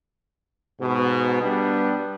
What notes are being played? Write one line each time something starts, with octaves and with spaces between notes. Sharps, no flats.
G#2 B2
G3 B3 D4